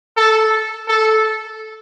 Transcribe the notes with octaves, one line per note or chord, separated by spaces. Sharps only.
A4
A4